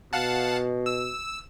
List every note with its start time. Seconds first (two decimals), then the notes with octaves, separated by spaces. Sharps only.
0.13 B2 F5 F#5 A5
0.86 E6